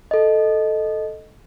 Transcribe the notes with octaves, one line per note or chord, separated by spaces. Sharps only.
A4 D#5